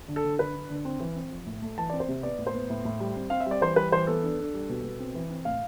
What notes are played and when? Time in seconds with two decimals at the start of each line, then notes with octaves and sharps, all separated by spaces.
0.08 D3
0.16 A4
0.24 D3
0.39 D3 B4
0.55 D4
0.70 D3
0.85 C4
1.00 E3
1.16 C4
1.31 F3
1.46 A2
1.62 A3
1.78 E3 A5
1.90 C4 D5
2.00 C5
2.08 C3
2.23 B3 D5
2.39 A2
2.47 C5
2.54 B3
2.70 A2
2.85 A2
3.00 G3
3.16 C4
3.30 C4 F5
3.40 E5
3.46 G3
3.51 D5
3.61 E3 C5
3.76 G3 B4
3.92 E3 C5
4.07 B3 A4
4.23 D4
4.39 D4
4.54 G3
4.69 B2
4.84 B2
4.99 C4
5.15 E3
5.30 C4
5.45 A2 F5